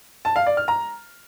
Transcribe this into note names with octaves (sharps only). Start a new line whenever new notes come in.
A5
F5
D5
F6
A#5